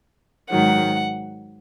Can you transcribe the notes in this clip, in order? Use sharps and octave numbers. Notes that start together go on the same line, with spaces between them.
G#2 D#3 F#3 F#5